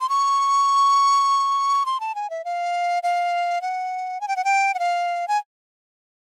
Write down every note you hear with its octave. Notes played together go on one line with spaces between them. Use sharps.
C6
C#6
C6
A5
G#5
E5
F5
F5
F#5
G#5
G5
F#5
G5
F#5
F5
G#5